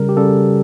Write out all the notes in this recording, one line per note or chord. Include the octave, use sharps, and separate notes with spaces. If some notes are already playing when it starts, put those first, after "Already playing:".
Already playing: C#3 G3 A#4
G4
C#3 G3 A4